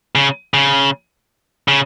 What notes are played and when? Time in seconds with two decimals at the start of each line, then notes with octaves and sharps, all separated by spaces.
0.15 C#3
0.54 C#3
1.68 C#3